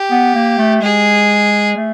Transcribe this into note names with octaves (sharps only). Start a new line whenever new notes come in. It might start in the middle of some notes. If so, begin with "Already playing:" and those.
Already playing: G4
B3
A#3
A3
G#3 G#4
A3